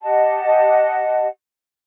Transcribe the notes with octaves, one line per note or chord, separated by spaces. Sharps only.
G4 D#5 F#5 A5